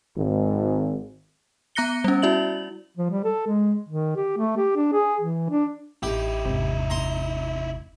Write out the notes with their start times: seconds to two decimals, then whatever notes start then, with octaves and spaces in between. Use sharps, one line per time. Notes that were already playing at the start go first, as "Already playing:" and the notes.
0.16 G#1
1.75 B3 A#5 F#6 A#6 C#7 G7
2.04 G3 C#4
2.22 E4 F#4 D5 E5 F#7
2.98 F3
3.11 G3
3.24 A4
3.47 G#3
3.89 D#3
4.16 G4
4.38 A3
4.57 G4
4.76 D4
4.93 G#4
5.21 E3
5.50 D4
6.03 A1 D#4 E4 G4
6.45 G#1 E2 C3
6.90 A#5 C6